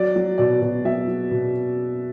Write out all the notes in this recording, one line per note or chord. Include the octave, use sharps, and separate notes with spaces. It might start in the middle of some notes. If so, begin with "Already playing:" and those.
Already playing: F#3 D5
F#3
B2 D5
B2
F#3 E5
F#3
B2